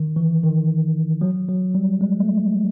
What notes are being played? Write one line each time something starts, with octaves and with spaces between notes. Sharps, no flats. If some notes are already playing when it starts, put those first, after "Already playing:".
Already playing: D#3
E3
D#3
F#3
F#3
G3
G#3
A3